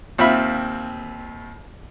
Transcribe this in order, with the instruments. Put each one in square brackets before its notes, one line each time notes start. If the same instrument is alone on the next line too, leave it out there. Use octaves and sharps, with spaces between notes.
[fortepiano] D#2 C4 F4 E5 B5